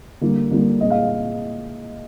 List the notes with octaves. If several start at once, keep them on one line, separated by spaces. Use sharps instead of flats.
D3 G3 A#3
D3 G3 A#3
A#2 G#3 D#5
F5